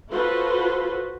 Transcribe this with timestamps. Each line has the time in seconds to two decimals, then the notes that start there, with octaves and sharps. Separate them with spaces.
0.11 F4 F#4 A4 B4 C5